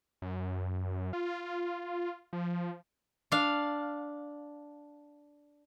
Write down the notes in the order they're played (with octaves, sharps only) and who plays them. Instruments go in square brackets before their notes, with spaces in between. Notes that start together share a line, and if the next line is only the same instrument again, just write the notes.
[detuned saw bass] F#2
F4
F3
[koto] D4 F5